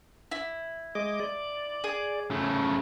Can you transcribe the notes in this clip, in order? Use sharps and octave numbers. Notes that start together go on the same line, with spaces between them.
E4
G#3 D#5 D6
D5
G#4
C#3 A3